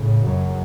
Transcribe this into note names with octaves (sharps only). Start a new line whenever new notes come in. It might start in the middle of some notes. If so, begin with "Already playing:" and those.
Already playing: A2 C#3
F#2 F#3